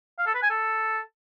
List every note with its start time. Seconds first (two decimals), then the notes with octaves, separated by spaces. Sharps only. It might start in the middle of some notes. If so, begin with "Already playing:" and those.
0.18 F5
0.26 A4
0.34 B4
0.42 G#5
0.50 A4